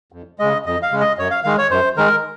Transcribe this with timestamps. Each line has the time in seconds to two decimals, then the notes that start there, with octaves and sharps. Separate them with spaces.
0.12 F2
0.39 C#3 G#3 D#5
0.66 F2 D#5
0.83 F5
0.92 C#3 G#3
1.00 D#5
1.18 F#2 C#5
1.31 F5
1.44 D#3 G#3 F5
1.58 C#5
1.70 F#2 C5
1.97 D#3 G#3 A#4